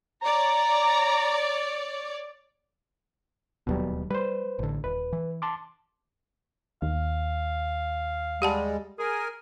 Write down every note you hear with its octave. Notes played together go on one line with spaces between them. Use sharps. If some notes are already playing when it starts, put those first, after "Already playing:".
C#5 D5 A#5
D1 D#2 B2 F#3 G3
G3 B4 C5
A1 D3
D#1 B4
E3
A5 C6 D6
D#2 F5
G3 G#3 G4 F#5 A5
G#4 A#4 G#5